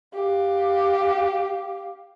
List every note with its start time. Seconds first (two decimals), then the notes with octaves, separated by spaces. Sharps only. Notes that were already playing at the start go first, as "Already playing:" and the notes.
0.14 G4 F5